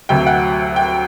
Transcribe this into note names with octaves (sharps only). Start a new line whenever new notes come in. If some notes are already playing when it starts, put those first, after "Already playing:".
D2 C3 F#3 G5
F#5
G5